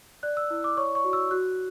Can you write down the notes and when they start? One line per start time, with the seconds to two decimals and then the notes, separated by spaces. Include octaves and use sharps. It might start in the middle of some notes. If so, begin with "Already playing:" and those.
0.23 D5 F#6
0.37 E6
0.50 E4
0.64 D6
0.77 C#5 C#6
0.95 C#6
1.04 F#4
1.13 E6
1.31 F#4 F#6